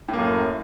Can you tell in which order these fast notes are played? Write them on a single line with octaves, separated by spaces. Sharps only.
A2 A#3 F#2